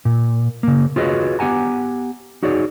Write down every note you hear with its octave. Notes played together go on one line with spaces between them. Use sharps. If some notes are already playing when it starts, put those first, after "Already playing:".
A#2
C#3 A#3
F4 F#4 G#4 B4 C#5 D#5
B3 G4 F#5 G#5 A#5
D#4 F#4 G#4 C#5 D5